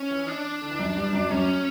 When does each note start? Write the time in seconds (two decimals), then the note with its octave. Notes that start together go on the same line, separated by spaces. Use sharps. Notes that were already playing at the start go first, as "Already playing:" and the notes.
Already playing: C#4
0.10 E3 E4
0.27 D4
0.61 D3
0.70 E3
0.79 F#2 F#3
0.96 G2 G3
1.13 F#2 F#3
1.30 F#2 F#3 C#4